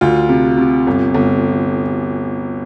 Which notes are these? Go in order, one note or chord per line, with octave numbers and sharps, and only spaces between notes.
D2 F4
C3
C3
G1
G1